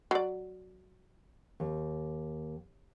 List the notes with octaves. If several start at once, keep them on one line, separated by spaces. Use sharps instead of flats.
F#3 D5
D#2